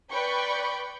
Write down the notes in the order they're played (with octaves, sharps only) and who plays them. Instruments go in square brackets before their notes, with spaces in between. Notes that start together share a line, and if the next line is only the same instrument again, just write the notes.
[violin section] B4 D5 G5 B5 C#6